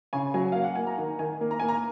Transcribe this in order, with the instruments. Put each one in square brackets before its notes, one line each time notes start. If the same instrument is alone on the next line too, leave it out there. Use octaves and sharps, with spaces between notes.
[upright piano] C#3 G#5
F#3 G#5
A#3 F5
F#5
A#3 G#5
A#5
D#3
D#3 G#5
A#3
A#5
A#3 G#5
A#5